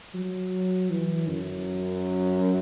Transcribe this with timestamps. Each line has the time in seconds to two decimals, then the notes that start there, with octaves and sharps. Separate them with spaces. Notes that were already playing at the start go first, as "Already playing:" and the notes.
0.14 F#3
0.90 E3
1.28 F#2